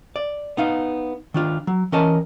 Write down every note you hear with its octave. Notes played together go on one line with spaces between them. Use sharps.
D5
B3 D#4 F5
D#3 D4 F4
F#3
E3 C#4 A#4 D#5 A5